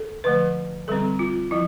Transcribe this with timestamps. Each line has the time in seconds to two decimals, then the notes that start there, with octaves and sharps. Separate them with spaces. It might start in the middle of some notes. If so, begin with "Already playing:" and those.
Already playing: A4
0.24 D3 F3 A3 B4
0.88 D3 G3 C4 A4
1.19 F4
1.51 F3 E4